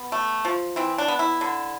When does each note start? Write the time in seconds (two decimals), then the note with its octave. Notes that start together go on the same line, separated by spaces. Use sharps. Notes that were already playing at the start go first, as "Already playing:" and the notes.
Already playing: B3
0.12 A3
0.45 F3
0.76 E3 C4
0.98 D4
1.08 B3
1.19 E4
1.41 D3